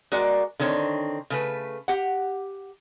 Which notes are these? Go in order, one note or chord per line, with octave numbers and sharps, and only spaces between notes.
G#3 F#4 A#4 D5
D3 D#3 C4 C#5
C#3 A3 B4
G4 F#5